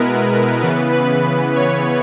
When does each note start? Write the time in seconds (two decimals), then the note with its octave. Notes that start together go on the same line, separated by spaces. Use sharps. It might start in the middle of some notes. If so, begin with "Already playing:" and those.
Already playing: B2 G#3 B3 E4 A#4 B4
0.61 C#3 E3 B3 B4
0.92 B4
1.24 B4
1.55 C#5